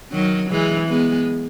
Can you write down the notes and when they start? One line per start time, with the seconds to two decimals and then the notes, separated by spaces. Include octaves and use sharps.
0.12 D#3 F#3
0.50 E3 G#3
0.89 G#3 B3